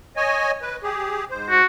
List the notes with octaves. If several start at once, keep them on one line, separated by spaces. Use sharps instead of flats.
C#5 D#5 G#5
B4
G4 G#4
G#2 C5
F#4